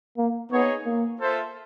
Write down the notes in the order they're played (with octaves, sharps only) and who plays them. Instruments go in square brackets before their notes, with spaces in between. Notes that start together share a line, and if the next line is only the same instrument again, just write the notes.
[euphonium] A#3
[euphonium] B3 [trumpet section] D#4 G#4 C#5
[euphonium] A#3
[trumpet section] F4 A4 C5 E5